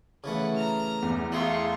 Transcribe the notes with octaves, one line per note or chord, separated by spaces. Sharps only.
C#3 E3 A3 B4 F#5
A#5 F6
E2
A3 E4 F4 G#4 C6 C#6